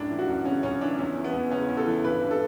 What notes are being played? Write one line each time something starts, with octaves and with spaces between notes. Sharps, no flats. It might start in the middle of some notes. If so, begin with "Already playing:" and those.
Already playing: F#2 A2 D4
E3
F#4
F#2
C#3 C#4
F#2 C#4
E3 D4
E2 C#4
E3
B3
E2
C#3 C#4
E2
A4
E3
G2 B4
G2
A4